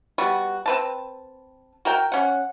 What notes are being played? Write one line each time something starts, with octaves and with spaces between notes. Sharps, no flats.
G3 B3 F#4
C4 B4 A5
F#4 A#4 G5
C#4 F#5